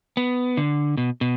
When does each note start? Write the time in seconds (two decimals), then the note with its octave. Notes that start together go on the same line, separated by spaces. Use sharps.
0.17 B3
0.57 D3
0.97 B2
1.21 B2